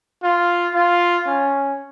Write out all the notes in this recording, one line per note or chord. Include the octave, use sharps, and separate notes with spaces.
F4
F4
C#4